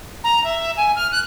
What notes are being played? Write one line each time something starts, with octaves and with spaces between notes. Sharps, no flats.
A#5
E5
G#5
F6
F#6